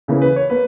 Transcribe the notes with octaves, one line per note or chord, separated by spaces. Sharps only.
C#3 E3 A#3
B4
C#5
A#3 B4